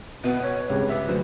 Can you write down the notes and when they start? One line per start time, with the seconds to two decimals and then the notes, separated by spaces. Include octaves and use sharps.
0.24 B2 B3 B4
0.42 C#5
0.70 C#2 G2 C3
0.89 G4 B4 E5
1.08 D2 F#3 C5